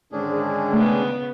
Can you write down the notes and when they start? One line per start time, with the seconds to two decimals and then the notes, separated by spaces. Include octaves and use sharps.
0.12 G#2 D3 D#3 C#4 D4 G#4
0.73 C#3 A3 B3